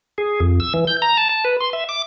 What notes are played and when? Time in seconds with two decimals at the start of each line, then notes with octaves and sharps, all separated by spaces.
0.18 G#4
0.40 F2
0.60 E6
0.74 E3
0.87 G6
1.02 A#5
1.17 A5
1.29 A5
1.45 B4
1.60 C6
1.73 E5
1.89 D6